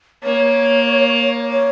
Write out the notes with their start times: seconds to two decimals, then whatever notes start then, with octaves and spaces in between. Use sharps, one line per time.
0.24 A#3 C#5
1.51 C#5